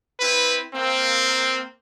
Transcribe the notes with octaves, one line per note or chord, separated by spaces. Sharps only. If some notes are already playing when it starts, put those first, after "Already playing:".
C4 E4 B4
A#3 C4